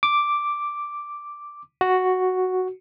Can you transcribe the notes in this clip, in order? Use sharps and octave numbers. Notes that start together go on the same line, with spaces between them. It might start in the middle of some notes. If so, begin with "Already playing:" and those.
D6
F#4